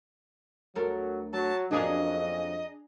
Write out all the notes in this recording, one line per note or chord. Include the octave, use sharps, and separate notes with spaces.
D2 F#3 A4 A#4
F#3 A5
F2 F#3 A#3 C#4 D4 G#4 D#5 A#5